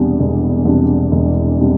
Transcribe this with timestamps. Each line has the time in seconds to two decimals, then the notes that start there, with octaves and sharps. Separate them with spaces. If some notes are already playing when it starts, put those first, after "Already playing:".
Already playing: E1 E2 C3 G3 D4
0.19 E1
0.65 E2 C3 G3 D4
1.12 E1
1.59 C3 G3 D4